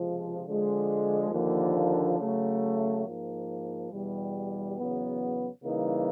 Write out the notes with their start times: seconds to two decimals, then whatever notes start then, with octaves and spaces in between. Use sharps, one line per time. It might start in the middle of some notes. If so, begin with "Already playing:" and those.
Already playing: C#2 C3 F3 G#3
0.45 D3 F3 G#3
1.31 D#2 D3 F3 A#3 D4
2.18 C#3 F#3 A3
3.05 G#2 F3 A#3
3.91 E2 B2 G3
4.77 E2 C#3 F#3 B3
5.63 C#3 E3 G3 A#3 D#4